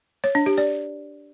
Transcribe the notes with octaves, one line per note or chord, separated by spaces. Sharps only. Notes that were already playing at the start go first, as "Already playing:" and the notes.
C#5
D4
G4
D5